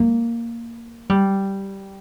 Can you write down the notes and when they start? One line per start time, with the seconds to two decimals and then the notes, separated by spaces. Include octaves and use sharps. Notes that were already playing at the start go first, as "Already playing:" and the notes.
Already playing: A#3
1.10 G3